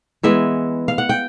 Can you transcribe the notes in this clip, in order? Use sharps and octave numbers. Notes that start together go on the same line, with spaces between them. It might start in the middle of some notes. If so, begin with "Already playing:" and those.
E3 G#3 B3 E5
F5
F#5
G5